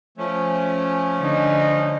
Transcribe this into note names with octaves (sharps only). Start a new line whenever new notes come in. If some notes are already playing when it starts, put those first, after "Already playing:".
F3 A3 C#4
D3 D#4